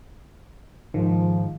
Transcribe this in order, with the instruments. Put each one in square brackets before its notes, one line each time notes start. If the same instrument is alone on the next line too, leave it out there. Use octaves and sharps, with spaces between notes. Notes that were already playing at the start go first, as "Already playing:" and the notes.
[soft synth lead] G#2 [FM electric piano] D#3 [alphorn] F3